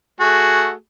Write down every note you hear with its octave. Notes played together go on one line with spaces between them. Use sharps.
A3 F#4 G#4